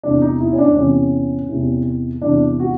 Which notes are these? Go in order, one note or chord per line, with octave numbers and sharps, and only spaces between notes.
E2 C3 E3 D4
D#4
E4
C#4
D4
E2 C3 E3 C#4
E2 C3 E3
E2 C3 E3 D4
F#4